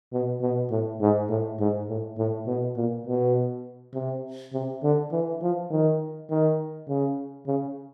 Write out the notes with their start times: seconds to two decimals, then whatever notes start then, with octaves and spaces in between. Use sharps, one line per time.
0.13 B2
0.41 B2
0.71 A2
1.01 G#2
1.29 A2
1.60 G#2
1.89 A2
2.18 A2
2.47 B2
2.76 A#2
3.07 B2
3.94 C3
4.54 C3
4.83 D3
5.12 E3
5.42 F3
5.70 D#3
6.30 D#3
6.89 C#3
7.47 C#3